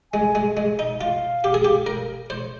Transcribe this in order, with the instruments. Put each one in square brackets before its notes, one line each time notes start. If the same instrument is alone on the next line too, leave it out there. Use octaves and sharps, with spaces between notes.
[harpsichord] G#3 [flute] G#5
[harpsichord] G#3
G#3
D#4
[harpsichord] F4 [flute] F5
[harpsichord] G4
G#4
G4
A#4
C5